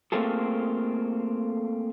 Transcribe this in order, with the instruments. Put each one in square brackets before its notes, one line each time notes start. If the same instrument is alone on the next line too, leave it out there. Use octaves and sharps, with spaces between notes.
[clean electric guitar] A3 A#3 C4 F4 G#4 A4